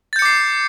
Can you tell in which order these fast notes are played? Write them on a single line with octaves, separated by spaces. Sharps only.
A6 G6 C#7 D6 C7